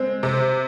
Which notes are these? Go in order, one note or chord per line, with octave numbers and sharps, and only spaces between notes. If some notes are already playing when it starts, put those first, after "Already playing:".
Already playing: G#3 C4
C3